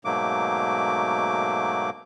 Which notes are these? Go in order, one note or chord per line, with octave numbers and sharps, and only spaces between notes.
G#2 B2 F#3 A3 A#3 D6